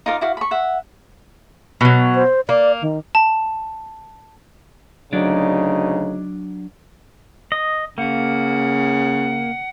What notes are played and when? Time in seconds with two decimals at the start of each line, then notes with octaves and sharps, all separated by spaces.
0.06 D#4 F4 A#4 D5
0.21 E4 F#4 F5
0.37 B5 C#6
0.51 E5 F#5
1.81 B2 F#3
2.15 C5
2.49 A#3 D5
2.82 D#3
3.15 A5
5.13 D2 C#3 F#3 D4 D#4 D5
7.52 D#5
7.98 C#3 A#3 F#5